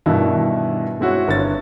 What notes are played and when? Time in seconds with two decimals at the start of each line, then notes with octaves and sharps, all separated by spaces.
0.06 G2 B2 D#3 E3 E4
1.00 G#3 C4 E4 F#4 C#5
1.28 G1 C#5 A6